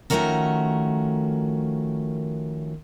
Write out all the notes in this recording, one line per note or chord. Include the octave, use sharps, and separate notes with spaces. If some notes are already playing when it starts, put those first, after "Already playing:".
D#3 F3 A3 C#4 F#4 A#4